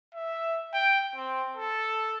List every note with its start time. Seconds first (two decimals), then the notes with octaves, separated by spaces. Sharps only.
0.14 E5
0.73 G5
1.15 C4
1.57 A4